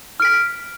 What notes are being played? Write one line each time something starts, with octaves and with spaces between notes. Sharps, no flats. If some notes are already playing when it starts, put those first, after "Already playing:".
F6 B6 D7